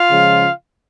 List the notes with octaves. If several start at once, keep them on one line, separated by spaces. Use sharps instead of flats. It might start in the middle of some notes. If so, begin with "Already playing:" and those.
Already playing: F4 F5
C#3 F3 G#3